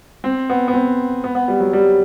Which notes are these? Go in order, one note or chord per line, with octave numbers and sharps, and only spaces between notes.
C4
B3
B3
C4
B3
B3
G3
F#3
G3